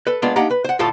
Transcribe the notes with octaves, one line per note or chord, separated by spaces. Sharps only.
A4 B4
G#3 A#3 B3 D4 F4
A#3 D4 D#4 G4 F#5 A#5
B4
C5 F#5
D2 A2 F3 F4 A4 A5